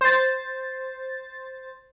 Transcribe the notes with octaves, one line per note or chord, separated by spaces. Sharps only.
C5 A6